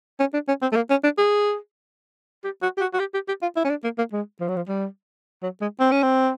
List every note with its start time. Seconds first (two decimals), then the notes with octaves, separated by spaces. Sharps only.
0.20 C#4
0.33 D4
0.48 C#4
0.62 C4
0.72 A3
0.75 A#3
0.90 C#4
1.04 D4
1.18 G#4
2.44 G4
2.62 F#4
2.77 G4
2.81 F#4
2.93 F#4
2.99 G4
3.14 G4
3.28 G4
3.42 F4
3.56 E4
3.64 C#4
3.69 D4
3.84 A#3
3.98 A#3
4.12 G#3
4.40 F3
4.48 F#3
4.56 F3
4.68 G3
5.42 F#3
5.61 G#3
5.79 C4
5.91 C#4
6.02 C4